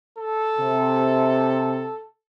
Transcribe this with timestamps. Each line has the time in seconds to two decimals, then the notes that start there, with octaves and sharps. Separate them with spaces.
0.18 A4
0.59 C3